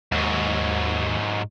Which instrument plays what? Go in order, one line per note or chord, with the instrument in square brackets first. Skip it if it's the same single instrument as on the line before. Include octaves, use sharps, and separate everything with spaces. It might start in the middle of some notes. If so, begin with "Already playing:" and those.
[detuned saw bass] D#2 [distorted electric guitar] G#2 F#3